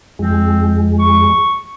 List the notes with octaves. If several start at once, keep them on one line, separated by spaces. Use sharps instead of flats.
F2 G#3 C4
C#6